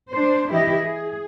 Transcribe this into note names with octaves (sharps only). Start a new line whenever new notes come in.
D4 C5
E3 E4 G4 D#5
G#4